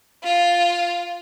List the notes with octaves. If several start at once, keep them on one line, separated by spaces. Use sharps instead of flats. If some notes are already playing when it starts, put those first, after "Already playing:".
F4